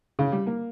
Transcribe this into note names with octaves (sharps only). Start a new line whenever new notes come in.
C#3
G3
A#3